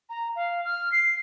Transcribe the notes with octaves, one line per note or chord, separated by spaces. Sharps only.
A#5
F5
F6
C7